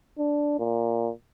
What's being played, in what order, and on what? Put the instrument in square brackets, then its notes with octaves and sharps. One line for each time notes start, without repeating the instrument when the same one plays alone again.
[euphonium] D4
A#2